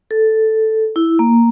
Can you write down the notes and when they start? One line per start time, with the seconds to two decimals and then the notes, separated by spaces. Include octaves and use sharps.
0.11 A4
0.96 E4
1.19 A#3